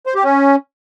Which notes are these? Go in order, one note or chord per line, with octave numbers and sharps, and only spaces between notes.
C5
G4
C#4